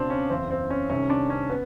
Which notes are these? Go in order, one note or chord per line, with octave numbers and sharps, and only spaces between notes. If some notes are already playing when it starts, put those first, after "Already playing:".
Already playing: C#2 B2 C4 D4
C#4
F#1 E2 C#3 C4
C4
C#4
C2 C3 D#3 C#4
D4
C#4
B3